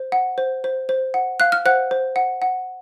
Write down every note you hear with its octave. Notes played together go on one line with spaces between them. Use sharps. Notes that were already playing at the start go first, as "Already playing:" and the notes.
Already playing: C5
F#5
C5
C5
C5
F#5
F5 F#6
F6
C5 F#5 F#6
C5
F#5
F#5